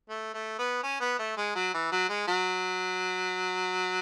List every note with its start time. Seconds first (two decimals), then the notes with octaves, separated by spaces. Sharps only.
0.10 A3
0.34 A3
0.59 B3
0.83 C#4
1.01 B3
1.19 A3
1.37 G#3
1.56 F#3
1.74 E3
1.92 F#3
2.09 G#3
2.28 F#3